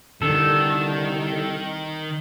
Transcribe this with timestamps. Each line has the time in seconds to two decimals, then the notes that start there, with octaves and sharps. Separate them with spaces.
0.22 C2 D3 D#3 A4